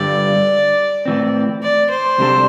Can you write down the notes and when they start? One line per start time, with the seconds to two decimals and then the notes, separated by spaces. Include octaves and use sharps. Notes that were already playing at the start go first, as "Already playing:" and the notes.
Already playing: G2 D3 G3 D5
1.06 A2 E3 C4
1.63 D5
1.90 C5
2.18 C2 C3 G3 D4 A4